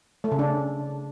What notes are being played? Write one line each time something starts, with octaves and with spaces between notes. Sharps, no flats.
A3
C#3
D4